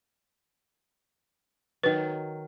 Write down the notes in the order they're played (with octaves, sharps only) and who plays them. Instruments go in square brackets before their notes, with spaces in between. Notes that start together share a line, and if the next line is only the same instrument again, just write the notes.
[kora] D#3 F#3 [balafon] B4